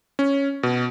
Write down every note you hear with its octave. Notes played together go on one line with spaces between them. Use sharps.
C#4
B2